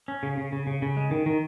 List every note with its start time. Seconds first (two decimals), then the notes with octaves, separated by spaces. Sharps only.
0.08 C#4
0.23 C#3
0.37 C#3
0.52 C#3
0.67 C#3
0.82 C#3
0.97 G#3
1.11 D#3
1.26 D#3